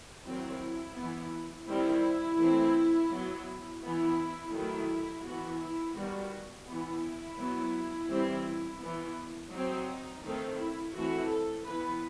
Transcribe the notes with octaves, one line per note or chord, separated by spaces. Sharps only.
D#3 F#3 C4 E4
E3 B3
D#3 G3 C4 E4
E3 A3 C4
F#3 B3
E3 B3 E4
D#3 F#3 A3 E4
E3 B3 F#4
E4
D#3 G3 B3 F#4
E3 B3 E4
F#3 B3
E3 G3 C4
E3 B3
F#3 C4 D#4
D#3 A3 C4 D#4
E4
E3 A3 C4 F#4
A4
E3 B3 B4